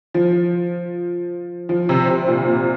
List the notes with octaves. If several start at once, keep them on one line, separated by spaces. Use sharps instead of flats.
F3
F3
C3
C3
A#2
A#2